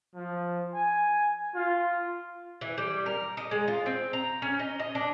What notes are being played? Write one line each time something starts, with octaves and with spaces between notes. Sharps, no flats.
F3
G#5
F4
E3
G3
A#4
D#5
G#3
F4
C4
A#5
C#4
D#5
D#5
D4